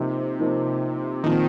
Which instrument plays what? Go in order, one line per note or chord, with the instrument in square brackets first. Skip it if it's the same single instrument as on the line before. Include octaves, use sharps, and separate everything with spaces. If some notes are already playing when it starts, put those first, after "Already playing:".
Already playing: [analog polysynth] C3 [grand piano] F3 A#3 D#4 C5
[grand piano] F3 A#3 D#4 C5
[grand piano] A#2 F3 C4 [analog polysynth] D#3